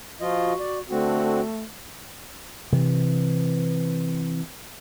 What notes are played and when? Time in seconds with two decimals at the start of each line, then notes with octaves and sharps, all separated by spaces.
0.21 F3 F4 F#4 D#5
0.59 D5
0.90 D3 A3 C4 F#4
2.73 C3 E3